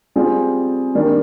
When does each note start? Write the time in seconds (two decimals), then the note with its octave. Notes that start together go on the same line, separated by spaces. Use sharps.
0.16 G3 C4 F4 G#4
0.95 D#3 G3 A#3 D4